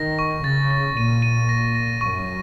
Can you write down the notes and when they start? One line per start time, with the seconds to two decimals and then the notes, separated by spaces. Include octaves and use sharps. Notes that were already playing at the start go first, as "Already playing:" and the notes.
Already playing: D#3 A#6
0.19 C#6
0.44 C#3 A6
0.71 A6
0.97 A#2 D#7
1.22 D#7
1.49 A#6
1.75 A#6
2.01 F#2 C#6